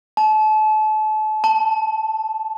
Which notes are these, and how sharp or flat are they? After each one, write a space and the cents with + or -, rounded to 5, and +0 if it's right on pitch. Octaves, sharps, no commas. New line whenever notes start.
A5 -35
A5 +5